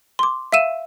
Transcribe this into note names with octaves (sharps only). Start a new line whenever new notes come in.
C6 D6
E5 F5 E6 D#7 E7